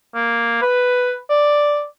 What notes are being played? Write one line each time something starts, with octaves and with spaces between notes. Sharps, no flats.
A#3
B4
D5